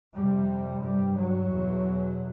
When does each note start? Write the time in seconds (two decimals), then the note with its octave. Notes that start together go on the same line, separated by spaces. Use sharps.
0.16 F2 C3 G3
0.84 G2 G3
1.18 F#3
1.51 E2 B2